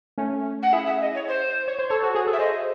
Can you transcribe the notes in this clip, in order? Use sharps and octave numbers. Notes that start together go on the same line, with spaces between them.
A3 C#4
F#5
E4 G#4 E5
E5
D#5
C#5
C5
C#5
C5
A4 C#5
F#4
G#4
A4
E5
G#4 C5 D#5